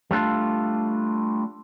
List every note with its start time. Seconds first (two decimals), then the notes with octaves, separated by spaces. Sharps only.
0.11 G3 A3 D4 F4